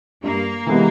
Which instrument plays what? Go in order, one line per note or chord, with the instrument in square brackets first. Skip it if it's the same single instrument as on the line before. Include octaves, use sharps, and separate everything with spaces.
[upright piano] G2 [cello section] A#3
[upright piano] E3 G#3 B3 G4